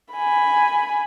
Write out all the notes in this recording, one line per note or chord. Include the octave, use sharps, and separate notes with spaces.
G#5 B5